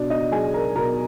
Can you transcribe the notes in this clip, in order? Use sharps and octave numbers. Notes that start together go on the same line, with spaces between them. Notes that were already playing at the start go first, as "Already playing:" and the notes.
Already playing: B2 D4 D5
D#4 D#5
F#3 G#4 G#5
A#4 A#5
B2 A#4 A#5